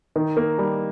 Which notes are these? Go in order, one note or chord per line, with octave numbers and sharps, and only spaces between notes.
D#3
A#3
G3